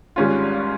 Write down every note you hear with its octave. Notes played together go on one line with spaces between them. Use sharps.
G#1 G#2 G3 C#4 F4